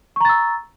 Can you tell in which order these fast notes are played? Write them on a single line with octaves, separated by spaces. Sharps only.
C#6 A#5 A6 E6